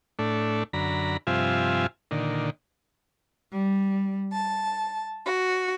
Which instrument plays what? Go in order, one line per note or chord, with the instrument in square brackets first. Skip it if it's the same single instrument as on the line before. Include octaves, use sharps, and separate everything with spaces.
[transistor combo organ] A2 A3 D4
F#2 D3 A#5 B5
G2 C3 F3 F4 E5 G#5
A#2 D3 D#3
[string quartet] G3
A5
F#4